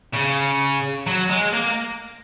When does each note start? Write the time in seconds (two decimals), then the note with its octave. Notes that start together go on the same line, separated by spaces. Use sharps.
0.14 C#3
1.07 F#3
1.30 G#3
1.53 A#3